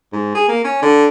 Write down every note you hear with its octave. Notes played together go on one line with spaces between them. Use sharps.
G#2
G#4
A#3
C#4
D3